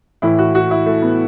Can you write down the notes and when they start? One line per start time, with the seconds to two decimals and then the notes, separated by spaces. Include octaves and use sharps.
0.22 A2 E3 E4
0.38 F#4
0.55 F#4
0.71 E4
0.86 A3
1.02 B3